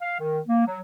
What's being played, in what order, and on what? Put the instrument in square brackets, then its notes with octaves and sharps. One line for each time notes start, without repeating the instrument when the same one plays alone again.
[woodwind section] F5
D#3
A#3
F#3